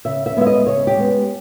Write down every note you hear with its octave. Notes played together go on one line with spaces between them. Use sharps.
C#3 E5
E5
G#3 B3 E5
D#5
C#3 C#5
G4
G#3 B3